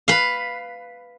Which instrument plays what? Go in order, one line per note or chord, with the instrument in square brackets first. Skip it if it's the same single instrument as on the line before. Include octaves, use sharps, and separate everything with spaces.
[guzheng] B4 F5